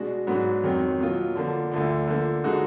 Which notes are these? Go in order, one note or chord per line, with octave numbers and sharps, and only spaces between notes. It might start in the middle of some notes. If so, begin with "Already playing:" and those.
Already playing: B2 G#3 D4 F#4
G#2 F#3 B3 D4 F#4
F2 D#3 F#3
B2 F#3 A#3 F4
D3 F3 A#3
D2 D3 F3
D3 F3 A#3
D3 G#3 D#4 F#4